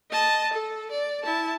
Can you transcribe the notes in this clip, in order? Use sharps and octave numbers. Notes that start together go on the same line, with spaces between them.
D#5 A5
A4
D5
E4 A5